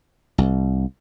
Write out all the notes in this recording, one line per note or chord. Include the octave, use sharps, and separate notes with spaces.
C2